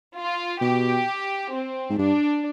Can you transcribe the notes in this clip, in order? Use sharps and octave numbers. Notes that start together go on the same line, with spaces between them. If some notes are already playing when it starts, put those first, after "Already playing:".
F4
B2 G4
C4
G#2
G2 D4